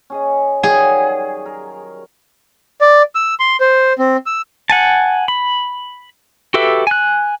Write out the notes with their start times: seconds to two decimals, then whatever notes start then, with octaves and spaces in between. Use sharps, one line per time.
0.10 C#4 G#4 D#5
0.63 D#3 F#3 G3 G#4
1.46 A#4
2.81 D5
3.15 E6
3.40 C6
3.60 C5
3.99 C4
4.26 E6
4.70 F#5 G#5 A5
5.28 B5
6.54 F#4 G4 A4 B4 E5
6.87 G#5 F#6